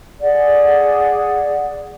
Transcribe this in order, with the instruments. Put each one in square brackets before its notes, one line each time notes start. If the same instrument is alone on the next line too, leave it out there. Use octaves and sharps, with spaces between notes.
[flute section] G#4 D5 F#5